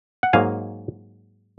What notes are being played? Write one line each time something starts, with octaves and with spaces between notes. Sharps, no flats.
F#5
G#2 F#3 A#3 D#4 F5 G#5